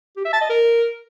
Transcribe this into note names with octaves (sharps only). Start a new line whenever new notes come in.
G4
E5
A5
D#5
A#4